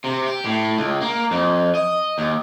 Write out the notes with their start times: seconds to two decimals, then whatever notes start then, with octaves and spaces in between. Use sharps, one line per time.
0.04 C3
0.26 G4
0.45 A2
0.77 C#2
1.01 A#3
1.31 F2
1.75 D#5
2.18 D#2